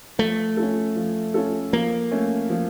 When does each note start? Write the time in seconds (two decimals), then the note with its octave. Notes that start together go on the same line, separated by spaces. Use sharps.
0.18 F3 A3
0.57 C#4 F4 A4
0.96 F3
1.34 C#4 F4 A4
1.73 F3 A#3
2.11 A3 C#4
2.50 F3